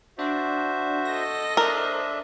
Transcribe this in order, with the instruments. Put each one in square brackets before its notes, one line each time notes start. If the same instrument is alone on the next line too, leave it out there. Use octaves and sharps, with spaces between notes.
[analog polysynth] D4 [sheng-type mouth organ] F#4 C5 E5
[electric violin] A4 D#5 [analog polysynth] A#6
[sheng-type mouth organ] D4 E5 [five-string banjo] A#4 [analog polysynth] C5